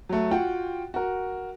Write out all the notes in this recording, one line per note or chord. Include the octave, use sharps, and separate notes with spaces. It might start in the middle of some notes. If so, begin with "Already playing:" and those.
F#3 A3
F4 F#4 F#5 G5
F#4 A#4